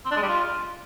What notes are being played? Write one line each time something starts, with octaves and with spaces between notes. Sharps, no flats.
C4
D4
G#3
G3
F4